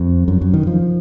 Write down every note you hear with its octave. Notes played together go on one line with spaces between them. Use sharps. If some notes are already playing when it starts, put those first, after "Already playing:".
Already playing: F2
F#2
F#2
D#3
F3